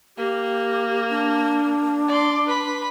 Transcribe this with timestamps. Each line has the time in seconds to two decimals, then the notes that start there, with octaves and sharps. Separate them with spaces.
0.18 A#3 G4
1.09 D4
2.08 D5 C6
2.47 B4 B5